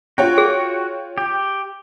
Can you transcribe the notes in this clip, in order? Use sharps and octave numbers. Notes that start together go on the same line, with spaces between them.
F4 F#4 C#5 G5
G#4
G4